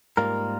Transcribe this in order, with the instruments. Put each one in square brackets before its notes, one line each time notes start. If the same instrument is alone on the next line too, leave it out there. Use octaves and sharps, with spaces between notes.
[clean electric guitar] G#2 G3 A#3 F4 A#4